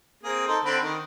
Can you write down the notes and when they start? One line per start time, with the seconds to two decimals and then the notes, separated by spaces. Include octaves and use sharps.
0.23 A#3 C4 G#4
0.47 D#4 A4 C5
0.65 D3 C4 B5
0.82 D#3